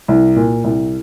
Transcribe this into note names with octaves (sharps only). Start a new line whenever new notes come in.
C2
A#2
C2